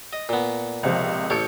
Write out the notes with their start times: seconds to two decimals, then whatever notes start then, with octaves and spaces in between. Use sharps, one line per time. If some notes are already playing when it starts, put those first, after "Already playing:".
0.13 D#5
0.29 A#2 B3
0.83 C#2 C3 F3
1.30 A1 A4 C#5 G6 C#7